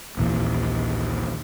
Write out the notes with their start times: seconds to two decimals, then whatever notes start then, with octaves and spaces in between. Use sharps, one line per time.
0.17 A#1 D#2 A#2 E3